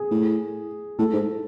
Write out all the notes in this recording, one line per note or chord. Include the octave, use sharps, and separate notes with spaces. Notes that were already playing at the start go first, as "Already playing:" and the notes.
Already playing: G#4
A2
A2 A4
G#2